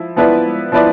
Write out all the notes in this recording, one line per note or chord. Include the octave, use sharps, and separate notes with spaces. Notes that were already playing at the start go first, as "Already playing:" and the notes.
Already playing: F3 E4
F3 B3 E4 B4 D5
F3 B3 E4 B4 D5